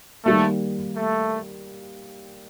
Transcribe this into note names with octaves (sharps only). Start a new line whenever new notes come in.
D#3 G3 A3 A#3
A3